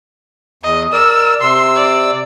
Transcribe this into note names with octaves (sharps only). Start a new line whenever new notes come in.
E2 D#5
A#4 D5 E6
C3 C6 E6
D5